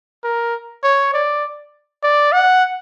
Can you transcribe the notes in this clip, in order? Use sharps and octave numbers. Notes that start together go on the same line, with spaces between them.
A#4
C#5
D5
D5
F#5